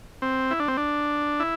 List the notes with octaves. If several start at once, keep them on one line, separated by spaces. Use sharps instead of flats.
C4
E4
D4
C4
D4
E4